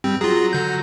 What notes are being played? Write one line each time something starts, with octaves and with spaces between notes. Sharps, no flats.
G2 G3 C4
F#3 F4 G#4 A#5
D3 G6